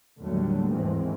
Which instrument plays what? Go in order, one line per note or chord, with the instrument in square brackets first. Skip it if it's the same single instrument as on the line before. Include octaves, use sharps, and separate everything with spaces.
[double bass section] D#2 A2 D3 F#3 G3 A3
D#2 G#2 D#3 E3 G#3 C4